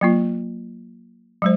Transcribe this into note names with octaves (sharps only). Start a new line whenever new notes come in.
F#3 A#3 F4
F#3 G#3 C5